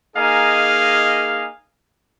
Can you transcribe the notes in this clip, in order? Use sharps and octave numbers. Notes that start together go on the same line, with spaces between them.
A#3 D#4 G#4 D#5 F5 G#5